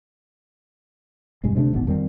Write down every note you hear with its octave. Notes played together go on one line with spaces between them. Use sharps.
E1 G2 G#3
D2 C3 A3 D4
D#1 G#1 G#2 B3
F2 D#3 G3 C4